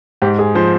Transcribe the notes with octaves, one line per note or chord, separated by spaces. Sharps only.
G#2 G4
G#4
F3 C5